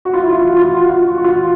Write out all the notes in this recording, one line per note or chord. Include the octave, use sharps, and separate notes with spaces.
F#4
F4
E4
F4
F#4
F4
F#4
F4
F#4
F#4
F4